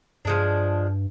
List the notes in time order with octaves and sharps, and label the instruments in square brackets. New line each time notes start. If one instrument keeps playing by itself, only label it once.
[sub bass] G2 [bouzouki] F3 G#3 D4